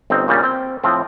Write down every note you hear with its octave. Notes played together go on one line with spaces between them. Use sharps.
G1 C4 D#4
A#2 C#3 G3
C4 G5
A2 F3 C4